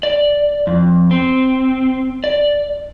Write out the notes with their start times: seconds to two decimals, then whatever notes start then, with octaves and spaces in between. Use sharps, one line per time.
0.03 D5
0.67 F2
1.11 C4
2.24 D5